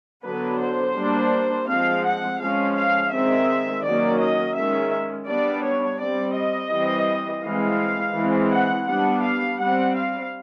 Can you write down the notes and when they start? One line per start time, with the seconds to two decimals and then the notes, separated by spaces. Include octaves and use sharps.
0.24 D3 F#3 B3 D4 B4
0.60 C5
0.96 G3 A#3 D4
1.68 F3 G#3 C4 F5
2.04 F#5
2.40 F3 G#3 C#4 F5
2.76 F5
3.12 D#3 G#3 C4 E5
3.83 D#3 F#3 A#3 C#4 D5
4.20 D#5
4.56 D#3 G#3 C#4 E5
5.27 G3 B3 D4 D5
5.64 C#5
6.00 G3 C4 D5
6.35 D#5
6.72 E3 G3 C4
7.43 E3 G#3 C4 F5
8.15 E3 G#3 C4
8.51 F#5
8.87 G3 B3 D4 F#5
9.23 F5
9.59 G3 C4 F#5
9.95 F5